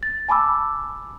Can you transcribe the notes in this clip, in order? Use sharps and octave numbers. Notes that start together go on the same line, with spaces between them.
A6
G#5 A5 B5 D6 E6